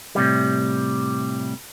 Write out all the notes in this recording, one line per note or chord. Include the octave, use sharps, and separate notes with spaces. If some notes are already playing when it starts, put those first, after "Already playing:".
A2 C3 G3